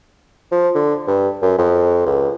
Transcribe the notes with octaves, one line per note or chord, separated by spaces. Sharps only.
F3
D3
G2
F#2
F2
C#2